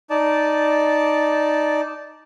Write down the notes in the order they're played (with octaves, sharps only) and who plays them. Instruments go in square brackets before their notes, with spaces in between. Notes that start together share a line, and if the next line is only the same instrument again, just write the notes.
[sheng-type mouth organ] D#4 D5 A5